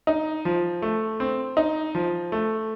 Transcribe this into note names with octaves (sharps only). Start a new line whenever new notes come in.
D#4
F3
A3
C4
D#4
F3
A3